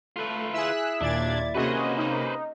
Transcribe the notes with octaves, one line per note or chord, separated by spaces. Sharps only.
A3 F4 B4
E4 G#4 E6 F#6
D#2 A#2 D4 D5 G#6 A6
C3 A#3 C#4 F#4 G#4 B4 C5 D#5
D#4